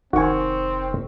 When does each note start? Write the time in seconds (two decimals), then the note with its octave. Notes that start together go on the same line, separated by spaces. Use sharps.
0.13 F1 D#3 C4 F#4 G#5 C#6